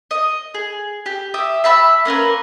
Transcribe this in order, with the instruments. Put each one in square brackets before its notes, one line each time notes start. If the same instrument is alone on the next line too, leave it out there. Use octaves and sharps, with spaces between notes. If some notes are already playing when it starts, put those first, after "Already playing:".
[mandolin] D#5
G#4
G4
G4 E5 D#6
E5 A5 B5 E6
A#3 C#4 A#4 B4